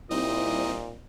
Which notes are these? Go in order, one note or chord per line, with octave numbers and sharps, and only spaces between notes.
A#2 G3 C4 D#4 E4 D#5